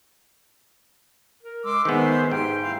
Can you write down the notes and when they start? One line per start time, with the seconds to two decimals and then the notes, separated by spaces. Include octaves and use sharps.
1.43 A#4
1.64 G#3 C6 D6 E6
1.85 D#3 B3 G#4 C5 E5
2.31 G#2 G4 G5 C6
2.60 E4 F5